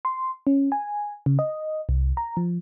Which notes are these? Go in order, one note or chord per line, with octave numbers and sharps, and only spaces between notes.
C6
C#4
G#5
C#3
D#5
C2
A#5
F3